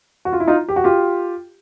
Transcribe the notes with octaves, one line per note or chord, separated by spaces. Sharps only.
F#4
F4
E4
D#4 F4
G4
F#4
F4 G4